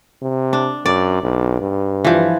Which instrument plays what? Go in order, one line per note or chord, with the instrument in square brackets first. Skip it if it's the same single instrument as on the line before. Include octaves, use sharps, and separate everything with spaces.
[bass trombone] C3
[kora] D4
[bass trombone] F#2 [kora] D5
[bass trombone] B1
G2
[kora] E3 F3